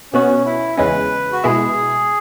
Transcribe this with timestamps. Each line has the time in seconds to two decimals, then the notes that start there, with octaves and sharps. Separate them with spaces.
0.13 B2 B3 C#4 F#4
0.45 E4
0.77 E2 C#3 G#3 C#4 B4
1.32 F#4
1.44 B2 G#3 B3 E4 G#4